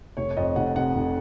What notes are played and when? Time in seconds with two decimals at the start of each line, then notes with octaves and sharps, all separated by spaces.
0.17 F1 C#5
0.31 C#5
0.37 F2 D#5
0.56 F1 F#5
0.76 C3 F#5
0.95 F1